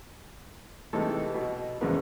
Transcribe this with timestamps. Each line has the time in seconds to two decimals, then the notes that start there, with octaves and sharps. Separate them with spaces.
0.93 C3 E3 G#3 A3 D#4 A4
1.34 B2
1.81 E2 G#2 C#3 F3 B3